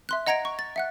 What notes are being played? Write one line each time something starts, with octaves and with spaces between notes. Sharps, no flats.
E5 C6 F#6
D#5 F#5 A#5 G#6 A#6 D7
C#6
A6
E5 F#5 F#6